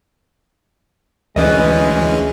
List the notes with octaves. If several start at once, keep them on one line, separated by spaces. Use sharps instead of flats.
D2 E3 G#3 C#4 B4 D#5